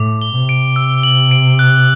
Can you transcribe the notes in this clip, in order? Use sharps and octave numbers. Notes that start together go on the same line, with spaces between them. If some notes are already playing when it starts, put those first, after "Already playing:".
Already playing: A2 D6
G7
C3
D7
E6
F#7
D7
F#6